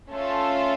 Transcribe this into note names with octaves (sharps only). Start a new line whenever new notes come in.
A3 C#4 F4 A4